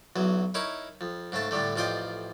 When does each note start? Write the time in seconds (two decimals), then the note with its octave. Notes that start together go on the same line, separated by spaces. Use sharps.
0.16 B1 E2 F#3
0.54 D#4 E4 A#4 C#5 C#6
1.01 F2
1.32 G#2 C#3 A3 A5
1.51 A2 D3 G3 A3
1.76 A1 F2 F4 D5 D#5 G5